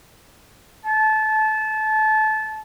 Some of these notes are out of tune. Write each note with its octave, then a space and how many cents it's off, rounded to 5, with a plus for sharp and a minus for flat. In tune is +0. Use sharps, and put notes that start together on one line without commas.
A5 -25